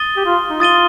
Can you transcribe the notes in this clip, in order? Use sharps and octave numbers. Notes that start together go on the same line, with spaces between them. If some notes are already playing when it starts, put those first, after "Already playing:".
Already playing: D#6 A6 D#7 G7
G4
F4
D#4
F4 D#6 A6 D#7 G7